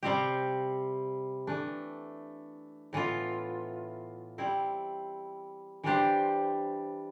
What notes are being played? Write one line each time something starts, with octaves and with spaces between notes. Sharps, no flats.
C3 G3 C4 G4
E3 A3 D4
A2 E3 B3 F4
G3 C4 E4
E3 G3 D4 G4 C5